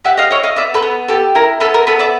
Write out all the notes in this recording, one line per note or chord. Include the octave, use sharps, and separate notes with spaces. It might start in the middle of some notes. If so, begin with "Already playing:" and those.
G4 E5 F#5
D#5 F5
E4 C#5 D#5
D#5 F5
B3 D5 E5
A4 B4
B3
G4 A4
E4 A#4
B3 A4 B4
A#4
B3 A4 B4
D5 E5